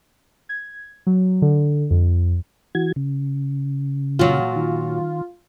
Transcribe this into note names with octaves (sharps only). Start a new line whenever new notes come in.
G#6
F#3
D3
F2
E3 F#4 G#6
C#3
A#2 F#3 F4
D#3